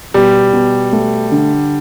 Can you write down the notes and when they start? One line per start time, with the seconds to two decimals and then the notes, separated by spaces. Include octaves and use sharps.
0.14 B2 G3
0.53 B2
0.93 A3
1.32 D3